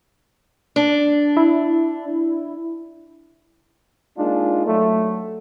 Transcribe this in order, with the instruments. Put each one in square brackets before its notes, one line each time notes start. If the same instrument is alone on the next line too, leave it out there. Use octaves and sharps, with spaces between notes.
[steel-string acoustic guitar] D4
[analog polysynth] E4
[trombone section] G#3 A#3 D4 D#4 F4
F#3 A3